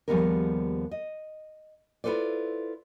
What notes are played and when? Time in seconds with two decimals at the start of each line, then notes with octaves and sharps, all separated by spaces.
0.08 D#2 F3 G3 B3 G#4 A#4
0.91 D#5
2.04 E4 F4 A4 B4 C5 D5